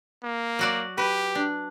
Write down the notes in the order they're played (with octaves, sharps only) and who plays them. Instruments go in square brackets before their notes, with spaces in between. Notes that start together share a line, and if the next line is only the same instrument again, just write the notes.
[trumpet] A#3
[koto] F#3 F#4 D5
[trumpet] G4 [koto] B4
[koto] D4